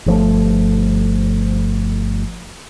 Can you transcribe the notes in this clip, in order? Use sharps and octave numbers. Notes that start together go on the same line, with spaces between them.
G1 F3 A3